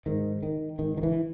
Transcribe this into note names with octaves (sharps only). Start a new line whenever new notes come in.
G#2 D#3
D#3
G#2 D#3
D#3
E3